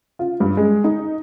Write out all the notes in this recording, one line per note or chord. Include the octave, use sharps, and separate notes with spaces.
F4
G2
G#3
D#4